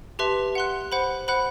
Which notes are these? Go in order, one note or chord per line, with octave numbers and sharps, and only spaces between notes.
G4 B4 E5 A5 C6
F#5 C6 F#6
C5 F#5 B5
C5 F#5 B5 F#6